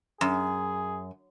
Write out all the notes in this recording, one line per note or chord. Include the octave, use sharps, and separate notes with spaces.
F#2 G#4